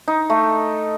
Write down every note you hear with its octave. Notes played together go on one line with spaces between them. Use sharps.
D#4
A3